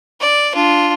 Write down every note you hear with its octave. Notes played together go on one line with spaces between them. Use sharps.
D5
D4 F4